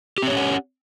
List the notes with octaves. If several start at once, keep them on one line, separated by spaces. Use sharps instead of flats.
C4 C#4 G4 C#5 F#5